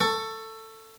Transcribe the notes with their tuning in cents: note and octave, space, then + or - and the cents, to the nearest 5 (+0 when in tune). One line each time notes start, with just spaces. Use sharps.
A4 +15 C#6 +0